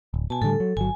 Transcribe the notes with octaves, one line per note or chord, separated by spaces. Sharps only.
D1
B2 G#5 A5
A2 D3 G3 A4
F#3
G1 F#3 G#5